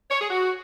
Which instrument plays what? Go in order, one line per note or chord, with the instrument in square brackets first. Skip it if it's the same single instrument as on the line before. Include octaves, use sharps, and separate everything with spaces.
[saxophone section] C#5
G#4
F#4